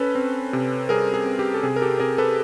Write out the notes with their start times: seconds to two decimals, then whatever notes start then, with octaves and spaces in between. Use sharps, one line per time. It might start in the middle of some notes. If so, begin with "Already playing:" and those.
Already playing: C#4 A4 B4
0.15 C4
0.53 C3
0.89 G3 G#4 A#4
1.14 G#4
1.26 C4
1.39 G4
1.54 A4
1.63 C3 G#4
1.76 A#4
1.82 G4 A4
2.00 C3 G#4 A#4
2.18 A4 B4